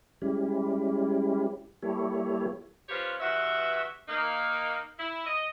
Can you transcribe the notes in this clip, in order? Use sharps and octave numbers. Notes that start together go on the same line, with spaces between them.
G3 G#3 C#4 E4 G4
G3 A#3 E4 G4 A4 C#5
F3 C#4 F4 G4 B4 C#5
G2 E3 F#4 E5
A#3 D#4
E4
D#5